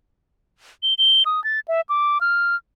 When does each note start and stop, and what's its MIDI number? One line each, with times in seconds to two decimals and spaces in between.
0.83 0.94 103
0.98 1.23 103
1.26 1.43 87
1.44 1.60 93
1.68 1.81 76
1.89 2.21 86
2.21 2.56 89